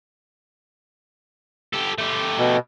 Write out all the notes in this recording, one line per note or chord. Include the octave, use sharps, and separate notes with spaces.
G4 A4
A3 G4
B2